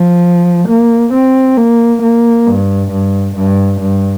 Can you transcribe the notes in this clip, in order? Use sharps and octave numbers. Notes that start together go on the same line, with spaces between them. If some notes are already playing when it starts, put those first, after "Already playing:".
Already playing: F3
A#3
C4
A#3
A#3
G2
G2
G2
G2